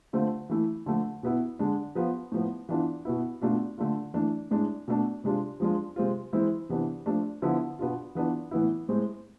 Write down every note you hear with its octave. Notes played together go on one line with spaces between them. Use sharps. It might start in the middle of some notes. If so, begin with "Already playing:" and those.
D3 A3 C4 F4
E3 A3 E4
D3 F3 A3
B2 B3 E4
D3 G#3 D4
F3 B3 F4
A2 F3 B3
E3 B3 D4 F4
B2 B3 E4
B2 A3 D4 F4
D3 A3 D4 F4
E3 A3 D4
A2 G#3 D4
B2 A3 D4
C3 G#3 D4 F4
F3 G#3 D4 F4
C3 G#3 C4 F4
E3 G#3 C4 E4
C3 E3 B3 D4
F3 A3 D4
D3 F3 B3 E4
B2 B3 D4 F4
E3 B3 D4 F4
A2 E3 B3 E4
A2 G#3 C4